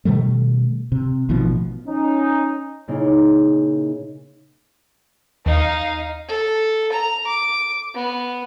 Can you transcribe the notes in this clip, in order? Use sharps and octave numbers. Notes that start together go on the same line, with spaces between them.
B2 D#3 G3 A3
C3
A1 B2 D#3 F3
C#4 D#4
A#2 C#3 A#3 D#4 E4 G#4
D#2 D#4 F5
A4
A#5
D6
B3